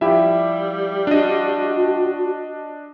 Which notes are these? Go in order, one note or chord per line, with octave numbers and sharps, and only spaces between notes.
F3 G3 E4 G4 E5
D4 F#4 D#5